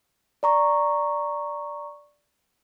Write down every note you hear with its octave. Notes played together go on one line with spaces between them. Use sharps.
D5 A#5 C#6